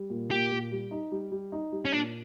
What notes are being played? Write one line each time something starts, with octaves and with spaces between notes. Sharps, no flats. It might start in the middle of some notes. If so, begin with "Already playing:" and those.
Already playing: G3
A#2
A#2 G4
A#2
G3
D#4
G3
G3
D#4
G3
C#4
A#2 D4